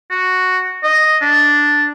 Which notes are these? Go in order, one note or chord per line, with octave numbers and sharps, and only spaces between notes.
F#4
D#5
D4